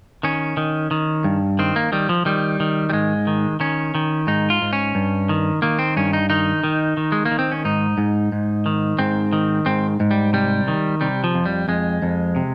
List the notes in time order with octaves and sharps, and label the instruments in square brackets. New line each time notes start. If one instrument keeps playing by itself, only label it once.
[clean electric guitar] D#3 C#4
D#3
D#3
G2
D#3 C4
A#3
D#3 G3
F3
D#3 G3
D#3
G3
G#2 G#3
D#3
D#3 C#4
D#3
G#2 D#4
F4
G#2
C#4
G2
D#3
D#3 A#3
C4
G2 C#4
D#4
D#3 D#4
D#3
D#3
G#3
A#3
D#3
C4
C#4
G#2 D#4
G#2
G#2
D#3
G#2 C4
D#3
G#2 C4
G#2
G3
C3 G3
D#3
C3 G3
F3
F2
G3
F2 G#3
F2
C3